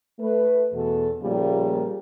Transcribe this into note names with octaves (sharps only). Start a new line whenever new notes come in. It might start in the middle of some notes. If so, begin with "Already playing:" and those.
A3 B4
E2 B2 A4
A#2 C#3 F3 G3 A3 A#3